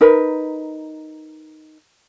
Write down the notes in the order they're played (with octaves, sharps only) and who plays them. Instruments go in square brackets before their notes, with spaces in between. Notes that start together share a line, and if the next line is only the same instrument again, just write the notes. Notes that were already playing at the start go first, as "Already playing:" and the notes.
[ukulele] D#4 A#4 B4